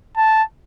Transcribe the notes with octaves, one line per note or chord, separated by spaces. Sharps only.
A5